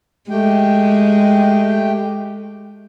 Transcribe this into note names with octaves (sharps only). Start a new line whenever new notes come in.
G#3 A3 G4 G5